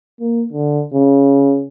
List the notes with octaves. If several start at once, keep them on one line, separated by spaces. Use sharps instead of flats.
A#3
D3
C#3